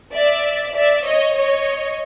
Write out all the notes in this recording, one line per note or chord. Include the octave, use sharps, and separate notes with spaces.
D5 E5
D5 E5
C#5 D#5
C#5 D#5